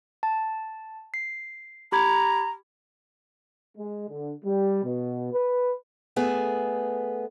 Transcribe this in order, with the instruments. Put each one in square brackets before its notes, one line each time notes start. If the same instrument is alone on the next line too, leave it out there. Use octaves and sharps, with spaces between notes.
[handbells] A5
C7
[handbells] G4 B5 G#6 [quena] A#5
[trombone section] G#3
D3
G3
B2
B4
[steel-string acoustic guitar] A3 B3 G#4